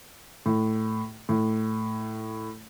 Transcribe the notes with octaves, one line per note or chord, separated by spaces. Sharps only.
A2
A2